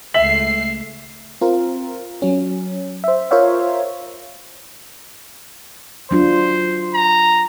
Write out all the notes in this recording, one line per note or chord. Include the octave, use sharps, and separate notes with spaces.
C#2 A3 E5 B6 C7 F#7
C4 F4 A#4
F#3 C#4
C5 E5
F4 A#4 C5 C#5 E5 F5
F#3 D4 F4 C5
A#5